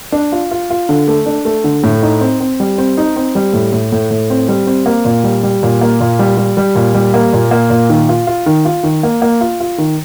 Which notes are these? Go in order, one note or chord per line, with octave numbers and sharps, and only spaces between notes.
D4
F4
F4
F4
D3
A3
D4
A3
D3
A2
D#4
C4
C4
G3
C4
D#4
C4
G3
A2
A2
A2
A2
C4
G3
C4
A#3
A#2
G3
G3
A#2
A#3
A#2
G3
G3
G3
A#2
G3
A#3
A#2
A#3
A#2
D#3
F4
F4
D#3
F4
D#3
A#3
A#3
F4
F4
D#3